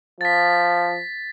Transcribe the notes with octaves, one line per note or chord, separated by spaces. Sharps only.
F3 A6 B6